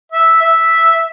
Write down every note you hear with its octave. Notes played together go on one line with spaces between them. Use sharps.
E5
E5